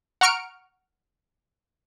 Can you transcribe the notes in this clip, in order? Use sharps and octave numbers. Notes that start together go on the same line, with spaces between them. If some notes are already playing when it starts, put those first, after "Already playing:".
F#5 A#5 C#6 F6 C#7 D7